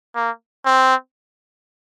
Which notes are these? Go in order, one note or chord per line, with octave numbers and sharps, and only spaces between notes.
A#3
C4